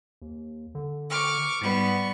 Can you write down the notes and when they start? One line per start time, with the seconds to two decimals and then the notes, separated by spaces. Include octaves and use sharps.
0.22 D#2
0.75 D3
1.10 C#6 D6 F6
1.62 G#2 G3 B3 C#6